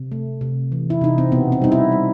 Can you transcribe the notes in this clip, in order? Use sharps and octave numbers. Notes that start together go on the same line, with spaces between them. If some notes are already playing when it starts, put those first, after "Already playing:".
Already playing: C3
A3
C3
E3
E4
C3 D#4
C4
B2 B3
C4
G3 D#4
E4
G3